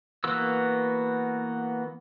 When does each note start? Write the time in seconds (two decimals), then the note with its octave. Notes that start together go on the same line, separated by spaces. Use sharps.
0.24 E3 A#3 B3 F#4 E6